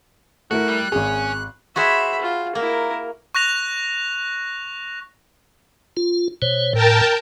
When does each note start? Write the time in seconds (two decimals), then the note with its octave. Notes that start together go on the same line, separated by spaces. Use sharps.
0.51 A3 E4 F#4 A#4 F#6
0.68 G3
0.92 G#1 C#4 G#4
1.76 F#4 G#4 C5 E5 B5
2.21 F4
2.55 A#3 E4 A#4
3.35 C#6 F#6 A#6 F7
5.97 F4
6.42 B2 C5 C#5
6.73 A2 A#4 G5 A5